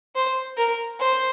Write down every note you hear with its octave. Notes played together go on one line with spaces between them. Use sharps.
C5
A#4
C5